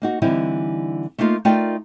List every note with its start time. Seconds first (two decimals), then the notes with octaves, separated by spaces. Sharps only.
0.02 A#3 D#4 F#4
0.22 D3 E3 G3 C4 D#4 E4
1.18 A3 A#3 D#4 F4 A#4
1.45 A3 D#4 F4 A#4 D5 G5